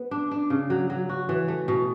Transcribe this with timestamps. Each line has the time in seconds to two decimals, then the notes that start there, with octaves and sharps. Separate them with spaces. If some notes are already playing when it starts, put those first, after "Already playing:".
Already playing: B3
0.11 D4
0.31 D4
0.50 C#3
0.70 F#3
0.90 F#3
1.09 F#4
1.29 E3
1.48 A3
1.68 B2